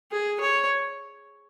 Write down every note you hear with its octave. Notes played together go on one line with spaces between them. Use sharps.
G#4
C#5